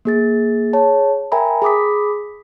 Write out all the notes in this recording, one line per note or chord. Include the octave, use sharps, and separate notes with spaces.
A#3 G#4 A6
G#4 C#5 A5
A#4 E5 G5 G#5 A#5 B5
G#4 B5 D6 D#6 B6